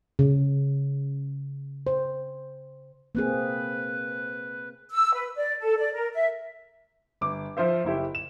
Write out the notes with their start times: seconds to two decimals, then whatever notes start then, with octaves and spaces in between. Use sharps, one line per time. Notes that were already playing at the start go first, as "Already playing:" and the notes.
0.19 C#3
1.87 C5
3.15 A#3 C4 G#4 B4
4.92 E6
5.13 B4
5.37 D5
5.60 A4
5.78 D5
5.94 A#4
6.13 E5
7.21 G1 D6
7.57 F3 F4 C5 E5
7.84 F#1 E4 G4
8.15 E7